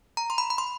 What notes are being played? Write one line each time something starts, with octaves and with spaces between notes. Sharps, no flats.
A#5
C6
B5
B5
C6